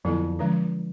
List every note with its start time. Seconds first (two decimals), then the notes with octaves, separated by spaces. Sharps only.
0.05 F2 D3 F#3 B3 E4 A4
0.39 D3 F3 G#3 C#4